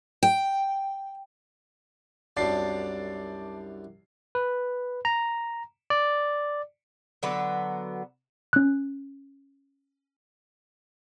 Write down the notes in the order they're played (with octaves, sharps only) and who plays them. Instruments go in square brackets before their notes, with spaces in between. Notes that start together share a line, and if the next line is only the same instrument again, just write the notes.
[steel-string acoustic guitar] G5
[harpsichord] C2 F#2 D4 [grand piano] D5 A5 C7
[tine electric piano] B4
A#5
D5
[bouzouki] D3 F#3 B3 B4
[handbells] C#4 F#6